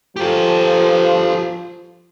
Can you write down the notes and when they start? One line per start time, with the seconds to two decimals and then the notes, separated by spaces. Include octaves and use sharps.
0.16 F3 G4 A4